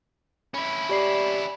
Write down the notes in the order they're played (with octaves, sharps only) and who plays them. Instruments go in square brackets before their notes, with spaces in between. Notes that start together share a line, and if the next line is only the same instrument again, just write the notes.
[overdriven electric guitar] C#4 E4 [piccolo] B5
[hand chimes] G4 D5 C7